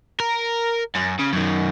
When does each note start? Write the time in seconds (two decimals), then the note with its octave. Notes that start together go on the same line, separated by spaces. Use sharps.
0.20 A#4
0.96 F#2
1.19 C#3
1.33 F#2 D#3